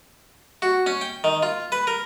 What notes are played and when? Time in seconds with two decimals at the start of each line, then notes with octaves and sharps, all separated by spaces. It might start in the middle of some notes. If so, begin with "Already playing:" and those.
0.62 F#4
0.86 C#4
1.01 G5
1.24 D#3
1.43 F4
1.72 B4
1.87 A#4